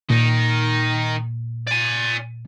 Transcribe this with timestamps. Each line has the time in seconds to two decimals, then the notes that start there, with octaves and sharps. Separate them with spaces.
0.10 A#2 D#3 D#4
1.67 D5 G#5